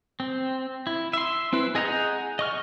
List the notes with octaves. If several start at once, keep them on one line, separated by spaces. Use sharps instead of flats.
C4
E4
E5 C6
C4 E4 B4
G#4 D#5 F#5 A#5 G6
D#5 C#6 F6